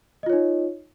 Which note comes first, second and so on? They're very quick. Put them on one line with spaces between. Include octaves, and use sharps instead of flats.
D#5 F4 C#5 D#4